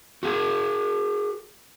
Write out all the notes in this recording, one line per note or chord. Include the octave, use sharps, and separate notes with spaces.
F#4 G#4